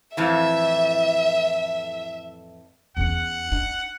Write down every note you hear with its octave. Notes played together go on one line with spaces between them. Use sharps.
F2 A2 E3 E5
E2 C#4 F#5
C#4 D#4